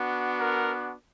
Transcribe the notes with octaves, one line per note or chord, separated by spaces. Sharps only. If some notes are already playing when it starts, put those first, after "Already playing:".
Already playing: B3 D4 F#4
A#4